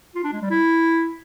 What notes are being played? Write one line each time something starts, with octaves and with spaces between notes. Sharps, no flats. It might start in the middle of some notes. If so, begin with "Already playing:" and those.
F4
D4
G#3
G3
E4